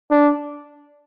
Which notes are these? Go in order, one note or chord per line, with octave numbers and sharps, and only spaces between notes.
D4